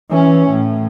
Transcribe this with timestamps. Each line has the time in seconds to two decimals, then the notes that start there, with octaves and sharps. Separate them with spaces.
0.10 E3 C#4
0.49 A2